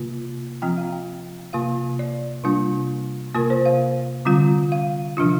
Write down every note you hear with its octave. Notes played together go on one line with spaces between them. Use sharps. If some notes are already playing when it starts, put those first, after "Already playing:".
Already playing: C3 A#3 F4
F3 C4 F4 G5
F5
G5
C3 A#3 F4 F5
D5
C3 G3 A#3 D4 F4
C3 A#3 F4 A#4
C5
F5
D3 G3 C4 F4
F5
C3 F3 D4 F4